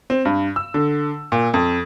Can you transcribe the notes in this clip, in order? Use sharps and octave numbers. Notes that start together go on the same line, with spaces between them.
C4
G2
E6
D3
A#2
F2